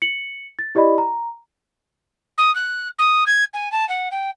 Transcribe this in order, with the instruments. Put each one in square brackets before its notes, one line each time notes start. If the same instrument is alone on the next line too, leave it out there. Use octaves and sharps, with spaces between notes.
[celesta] C#7 F#7
A6
E4 G4 D5 D#5 B5
A#5
[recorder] D#6
F#6
D#6
G#6
G#5
A5
F#5
G5